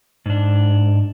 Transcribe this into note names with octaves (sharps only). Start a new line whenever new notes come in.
G#2 D4